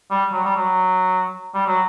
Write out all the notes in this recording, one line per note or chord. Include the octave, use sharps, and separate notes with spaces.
G3
F#3
G3
F#3
G3
F#3